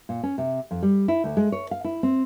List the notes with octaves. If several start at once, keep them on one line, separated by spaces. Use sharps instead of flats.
A#2
C#4
C3
F2
G3
E4
D2
G#3
C#5
F5
E4
C4